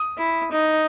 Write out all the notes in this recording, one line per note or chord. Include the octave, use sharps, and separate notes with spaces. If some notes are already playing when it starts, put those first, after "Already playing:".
Already playing: D#6
E4
D#4